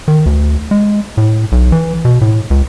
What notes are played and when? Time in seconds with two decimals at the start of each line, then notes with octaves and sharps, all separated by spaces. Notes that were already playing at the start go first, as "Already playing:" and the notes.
0.08 D#3
0.26 D2
0.71 G#3
1.17 A2
1.52 B1
1.72 E3
2.05 B2
2.21 A2
2.50 C#2